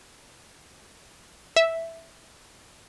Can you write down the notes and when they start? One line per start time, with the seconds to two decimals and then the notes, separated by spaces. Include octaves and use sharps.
1.56 E5